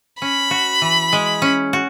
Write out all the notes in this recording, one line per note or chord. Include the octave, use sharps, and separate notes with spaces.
C#4 B5
F#4
E3
G#3
C#4
F#4